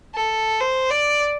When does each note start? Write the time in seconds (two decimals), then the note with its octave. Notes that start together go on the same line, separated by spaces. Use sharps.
0.15 A4
0.60 C5
0.90 D5